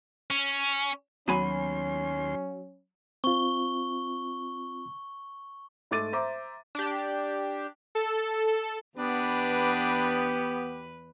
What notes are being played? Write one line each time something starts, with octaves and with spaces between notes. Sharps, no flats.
C#4
D#2 F#3 B3 C#4 G#5 B5 C6
C4 F4 C#6 G7
G#2 A3 D6 A6 D#7
C5 E5 A#5 D6
D4 G4
A4
E2 B3 D4 G4 B4